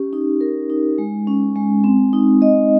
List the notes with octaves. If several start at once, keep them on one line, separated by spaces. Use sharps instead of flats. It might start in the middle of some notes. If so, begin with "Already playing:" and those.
Already playing: C#4 G4
D#4
A#4
D#4
G#3
C#4
G#3
C4
D#4
D#5